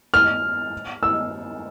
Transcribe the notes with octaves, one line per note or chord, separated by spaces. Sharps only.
F6
E6